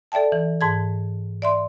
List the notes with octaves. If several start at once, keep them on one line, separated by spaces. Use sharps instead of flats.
A4 D5 E5 G5 A5
E3
G#2 A5 G#6
D5 E5 C6